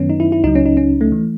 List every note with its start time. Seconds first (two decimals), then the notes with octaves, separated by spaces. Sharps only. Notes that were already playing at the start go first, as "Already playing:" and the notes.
Already playing: F#2 D#3 F#3 B3 C#4
0.10 D#4
0.20 E4
0.32 E4
0.44 C#2 C#3 F#3 D#4
0.55 C#4
0.66 D#4
0.77 C#4
1.01 A3
1.12 E3